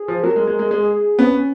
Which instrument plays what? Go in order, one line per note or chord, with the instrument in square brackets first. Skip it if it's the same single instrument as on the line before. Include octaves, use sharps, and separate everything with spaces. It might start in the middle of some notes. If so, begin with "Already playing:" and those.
Already playing: [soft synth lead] G#4
[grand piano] F3
[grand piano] F#3 [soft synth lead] A#4
[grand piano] G#3
[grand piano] G#3 [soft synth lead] A#4
[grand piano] G#3
[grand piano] G#3 [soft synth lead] G#4
[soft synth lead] G#4
[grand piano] B3 [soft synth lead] C#4